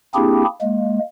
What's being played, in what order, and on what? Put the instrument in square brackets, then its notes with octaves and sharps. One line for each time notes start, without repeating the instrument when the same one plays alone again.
[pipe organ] A#3 C4 D4 E4 G4 G#4
G#3 A#3